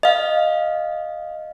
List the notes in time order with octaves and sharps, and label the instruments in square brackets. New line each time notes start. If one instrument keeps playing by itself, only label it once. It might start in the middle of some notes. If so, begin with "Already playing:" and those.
[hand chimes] D#5 F5